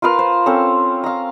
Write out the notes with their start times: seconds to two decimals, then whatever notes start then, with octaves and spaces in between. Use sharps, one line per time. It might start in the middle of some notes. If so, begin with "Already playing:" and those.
0.02 F4 A#4 B4 F5
0.19 C5
0.46 C4 C#4 A4
1.04 F5 A#5